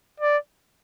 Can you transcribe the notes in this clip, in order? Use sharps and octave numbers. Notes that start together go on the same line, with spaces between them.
D5